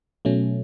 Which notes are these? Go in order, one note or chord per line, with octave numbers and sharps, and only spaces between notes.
B2 F#3 A3 C#4